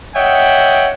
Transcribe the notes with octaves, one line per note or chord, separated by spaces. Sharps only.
C#5 D#5 E5 F#5 G5